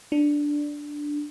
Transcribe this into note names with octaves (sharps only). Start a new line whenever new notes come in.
D4